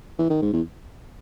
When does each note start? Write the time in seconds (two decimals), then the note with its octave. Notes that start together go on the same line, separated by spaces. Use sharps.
0.19 E3
0.30 D#3
0.42 G#2
0.53 E2